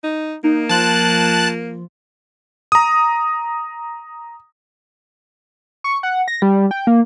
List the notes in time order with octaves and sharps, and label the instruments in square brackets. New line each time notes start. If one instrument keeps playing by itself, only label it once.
[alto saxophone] D#4
[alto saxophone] A#3 [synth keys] D#4
[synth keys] F3 F4 [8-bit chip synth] A5 F#6
[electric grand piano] A#5 D#6
[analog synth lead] C#6
F#5
A#6
G3
G5
A#3